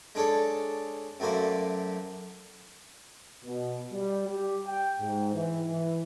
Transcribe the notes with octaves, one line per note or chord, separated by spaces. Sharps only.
G#3 D4 A4 C#5 D5
F#2 A3 A#3 C5 D5
B2
G3
G4
G5
G#2
E3
E3